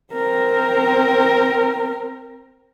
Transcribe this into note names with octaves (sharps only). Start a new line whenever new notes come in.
C4 A#4